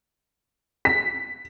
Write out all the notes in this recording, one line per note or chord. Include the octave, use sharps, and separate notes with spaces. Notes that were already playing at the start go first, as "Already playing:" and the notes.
B6